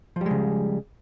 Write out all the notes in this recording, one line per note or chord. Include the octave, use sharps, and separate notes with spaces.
C#3 F3 G3 G#3